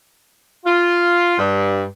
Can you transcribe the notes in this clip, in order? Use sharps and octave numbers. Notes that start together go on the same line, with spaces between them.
F4
G2